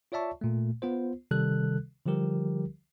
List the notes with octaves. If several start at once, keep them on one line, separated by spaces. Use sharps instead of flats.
F4 C#5 D5 E5 A5 C#6
A#2 A3
B3 F4 C5
C3 D#3 G3 A4 F#6
D3 F3 G3 G4 A#4